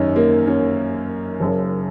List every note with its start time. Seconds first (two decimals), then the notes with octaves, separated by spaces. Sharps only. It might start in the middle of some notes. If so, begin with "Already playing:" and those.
Already playing: G#1 F#2 D#3 C#4 D#4
0.16 A#3
0.47 C#4
1.40 F#1 F#2 C#3